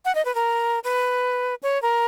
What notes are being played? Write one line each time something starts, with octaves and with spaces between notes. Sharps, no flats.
F#5
D#5
B4
A#4
B4
C#5
A#4